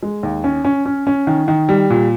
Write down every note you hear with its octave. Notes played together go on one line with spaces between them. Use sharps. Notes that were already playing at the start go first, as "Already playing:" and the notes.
G#3
D#2
C#4
C#4
C#4
C#4
D#3
D#3
G3
A#2